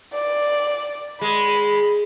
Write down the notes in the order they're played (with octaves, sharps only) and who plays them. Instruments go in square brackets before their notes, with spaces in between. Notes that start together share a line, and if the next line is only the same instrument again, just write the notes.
[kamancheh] D5
[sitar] G#3 [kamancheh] B5